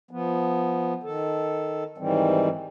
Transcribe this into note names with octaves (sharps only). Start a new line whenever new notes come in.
F3 B3
D#3 A4
G#2 D#3 E3 G3 C4